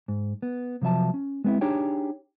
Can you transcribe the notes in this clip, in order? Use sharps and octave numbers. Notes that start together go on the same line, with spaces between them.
G#2
B3
C3 F3 F#3 E5 A5
C#4
G#3 B3 C4 E4
D4 D#4 G4 G#4 C#5 G5